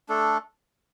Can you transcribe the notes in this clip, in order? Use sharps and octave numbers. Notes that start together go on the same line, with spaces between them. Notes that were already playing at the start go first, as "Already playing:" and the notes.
A3 D4 A4